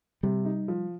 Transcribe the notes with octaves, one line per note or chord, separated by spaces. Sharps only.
C3 G3
D#4
F3